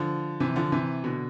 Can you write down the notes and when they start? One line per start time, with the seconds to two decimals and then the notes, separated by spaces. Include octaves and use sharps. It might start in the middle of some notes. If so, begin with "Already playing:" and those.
Already playing: D3 F3
0.40 C3 E3
0.56 D3 F3
0.72 C3 E3
1.04 B2 D3